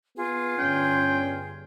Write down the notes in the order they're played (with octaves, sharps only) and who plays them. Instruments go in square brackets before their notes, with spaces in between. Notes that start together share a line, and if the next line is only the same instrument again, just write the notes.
[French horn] B3 [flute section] F4 G#4
[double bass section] G1 [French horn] C#4 [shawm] G5